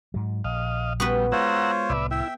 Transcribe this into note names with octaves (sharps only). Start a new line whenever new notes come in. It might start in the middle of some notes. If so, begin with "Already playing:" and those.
G#2 F#3
A#1 D#5 F5
G3 B3 F#4 B4
G#3 F4 C5 C#5 F#5 A#5 E6
C2 A2 B4 D5 E5
E4 E5 G5